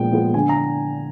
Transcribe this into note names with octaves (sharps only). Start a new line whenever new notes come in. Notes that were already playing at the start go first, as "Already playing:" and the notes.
Already playing: A#2 F3 G#3 B3 G5
F3 G#3 B3
D3 G#5
A#5